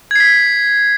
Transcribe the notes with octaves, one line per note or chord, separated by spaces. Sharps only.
G#6 B6 C7